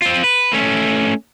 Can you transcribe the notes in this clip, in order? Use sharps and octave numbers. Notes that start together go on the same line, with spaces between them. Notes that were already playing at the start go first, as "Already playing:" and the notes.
C4 F4
B4
A3 C#4